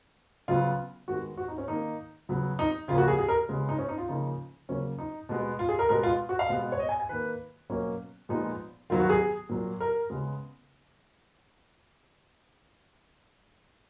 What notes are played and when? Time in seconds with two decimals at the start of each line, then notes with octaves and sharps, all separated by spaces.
0.48 C#3 F#3 B3 F4
1.08 D#3 G#3 B3 F#4
1.37 F#4
1.48 D#4
1.58 C#4
1.68 D#3 A#3 D#4
2.29 C#3 F#3 B3
2.59 D#4
2.88 C#3 F3 A#3 F4
2.98 F#4
3.08 G#4
3.18 G#4
3.28 A#4
3.49 C#3 G#3 B3
3.69 D#4
3.78 C#4
3.89 D#4
3.98 F4
4.08 C#3 F3 A#3 D#4
4.69 C#3 F#3 A#3 C#4
4.99 D#4
5.29 B2 G#3 B3
5.59 F4
5.69 G#4
5.79 A#4
5.89 B2 G#3 B3 A#4
6.03 F4
6.29 F#4
6.39 F5
6.49 B2 G#3 B3
6.72 C#5
6.79 D#5
6.89 G#5
7.00 G#5
7.09 D#3 A#3 B4
7.70 B2 F#3 A#3 C#4
8.29 A#2 F3 G#3 B3 D#4
8.90 D#3 F#3 B3 F4
9.00 F#4
9.10 G#4
9.49 A#2 F#3 A#3
9.80 A#4
10.10 C#3 G#3 B3